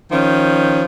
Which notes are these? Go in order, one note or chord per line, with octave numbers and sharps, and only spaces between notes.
D#3 F3 C#4